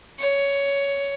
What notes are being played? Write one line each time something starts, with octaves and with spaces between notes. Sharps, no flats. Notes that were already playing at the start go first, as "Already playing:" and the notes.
C#5